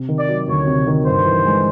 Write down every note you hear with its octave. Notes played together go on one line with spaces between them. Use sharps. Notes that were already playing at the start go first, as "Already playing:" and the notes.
Already playing: C3
D#3
D5
F#3
D2 C#5
C3
D#3
G2 C5
E3
G#3